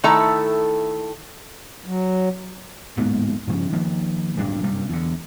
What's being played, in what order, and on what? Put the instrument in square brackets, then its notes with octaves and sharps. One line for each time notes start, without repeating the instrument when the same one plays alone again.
[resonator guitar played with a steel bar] D#3 A3 E4 A4 E5 A#5
[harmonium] F#3
[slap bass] D1 G#2 A#3 B3
G2 C#3 F3
D#3 F3 A#3
D1 D2 G2 D4
F#1 G2 C3 G3
E2 D3